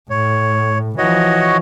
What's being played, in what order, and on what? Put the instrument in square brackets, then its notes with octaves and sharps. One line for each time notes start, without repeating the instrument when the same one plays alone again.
[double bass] A2 [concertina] C#5
[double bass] E3 F3 [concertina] F#4 C#5 D#5